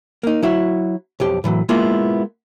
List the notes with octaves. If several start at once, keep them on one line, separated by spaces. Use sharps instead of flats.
A#3 D#4
F#3 E4 F#4
B1 F2 G4
A2 E3 F#3
G#3 A#3 B3 E4 F4